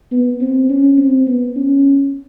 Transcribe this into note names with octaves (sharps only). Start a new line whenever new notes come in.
B3
C4
C#4
C4
B3
C#4